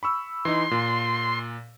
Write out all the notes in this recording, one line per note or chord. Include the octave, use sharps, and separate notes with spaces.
B5 C#6 E6
E3 D#4 C6
A#2